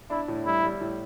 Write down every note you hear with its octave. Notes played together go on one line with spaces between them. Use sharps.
D4 E4
A2
G3 E4
G3
A2